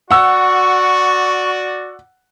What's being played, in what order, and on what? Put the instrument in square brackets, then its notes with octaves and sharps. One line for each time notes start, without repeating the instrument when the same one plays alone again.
[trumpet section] F#4 D5 [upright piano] F#5 E6 [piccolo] C#6